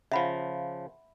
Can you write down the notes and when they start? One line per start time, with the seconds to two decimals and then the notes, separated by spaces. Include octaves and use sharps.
0.12 C#3 F3 E5 F#5 B5